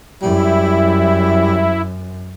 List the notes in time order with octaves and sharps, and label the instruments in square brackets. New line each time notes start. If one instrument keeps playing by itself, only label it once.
[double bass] F#2 [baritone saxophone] G3 [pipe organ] E4